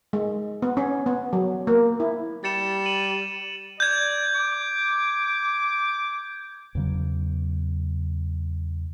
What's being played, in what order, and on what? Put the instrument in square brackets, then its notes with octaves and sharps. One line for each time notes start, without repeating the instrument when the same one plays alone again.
[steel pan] G#3
B3
C#4
B3
F#3
A#3
E4
[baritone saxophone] G3 [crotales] A6 C#7 E7
[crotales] D#7 F#7
[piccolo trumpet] D5 [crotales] G6 G#6
[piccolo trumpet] D6
[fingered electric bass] E2 C#3 F#3